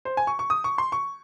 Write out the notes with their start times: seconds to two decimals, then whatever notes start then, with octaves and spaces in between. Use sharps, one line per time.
0.05 C5
0.17 G#5
0.27 C#6
0.39 C#6
0.50 D#6
0.64 C#6
0.78 C6
0.92 C#6